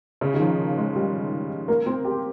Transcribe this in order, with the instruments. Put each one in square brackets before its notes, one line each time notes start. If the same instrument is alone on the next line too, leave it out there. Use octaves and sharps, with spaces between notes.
[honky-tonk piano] C#3
D#3
F3
G#3
G3
A#3
C4
G4